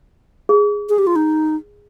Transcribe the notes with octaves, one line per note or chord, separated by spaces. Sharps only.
G#4
G#4
G4
F4
D#4